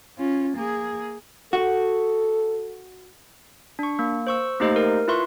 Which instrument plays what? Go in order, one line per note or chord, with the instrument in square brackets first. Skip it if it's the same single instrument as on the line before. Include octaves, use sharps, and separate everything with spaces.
[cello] C#4 F4
A#3 G#4
[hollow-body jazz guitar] F#4 [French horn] A4
[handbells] D4 C#6
A#3
C5 C#6 E6
A3 A#3 D#4 G4 C5 D#5
A#4
E4 F4 B4 E5 C6 C#6